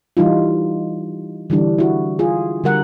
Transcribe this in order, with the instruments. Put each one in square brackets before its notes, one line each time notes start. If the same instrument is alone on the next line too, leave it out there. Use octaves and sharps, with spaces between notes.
[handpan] E3 G3 D#4 F4
D3 E3 G3 D4
E4 F#4
F4 G#4
D3 G3 A#4 F#5